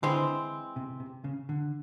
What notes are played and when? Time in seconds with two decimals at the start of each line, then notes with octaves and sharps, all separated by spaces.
0.03 D3 E3 G#3 C4
0.76 C3
1.00 C3
1.24 C#3
1.49 D3